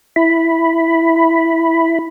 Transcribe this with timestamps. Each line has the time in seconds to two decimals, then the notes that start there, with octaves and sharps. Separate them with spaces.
0.16 E4 B5